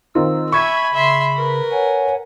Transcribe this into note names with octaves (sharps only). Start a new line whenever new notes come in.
D#3 C4 F4 E6
E5 G#5 B5 C#6 G#6 B6
C#3 E5 C6
A#4 B4
C#5 F#5 G#5